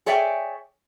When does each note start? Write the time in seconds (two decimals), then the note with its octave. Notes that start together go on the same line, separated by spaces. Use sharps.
0.06 G#4 C#5 D5 E5 G5 G#5